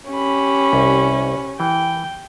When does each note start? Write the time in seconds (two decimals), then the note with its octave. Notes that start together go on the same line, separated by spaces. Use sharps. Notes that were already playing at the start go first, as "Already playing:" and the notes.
0.10 C#4 G4 B5
0.73 C2
1.60 E3 G5